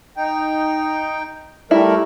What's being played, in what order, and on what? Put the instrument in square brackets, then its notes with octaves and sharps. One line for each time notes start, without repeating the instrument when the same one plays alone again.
[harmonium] D#4 G5
[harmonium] G3 A3 A#4 [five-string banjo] E4